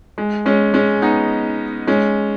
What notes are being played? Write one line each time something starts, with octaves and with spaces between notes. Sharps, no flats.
G#3
G#3 C#4
G#3 C#4
B3 D#4
G#3 C#4